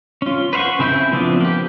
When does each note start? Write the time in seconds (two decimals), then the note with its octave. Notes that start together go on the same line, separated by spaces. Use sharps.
0.22 C#4 F4
0.53 B4 C5 F5 F#5 C#6
0.79 C#3 C4 E4 E5 G6
1.12 F3 B3 C4 D4 F4
1.41 A#3 G4